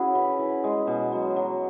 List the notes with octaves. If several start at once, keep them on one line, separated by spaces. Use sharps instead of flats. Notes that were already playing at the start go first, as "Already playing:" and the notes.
Already playing: C#4 E4 F#4 G#4
E3
E3
G#3
B2
F#3
F#3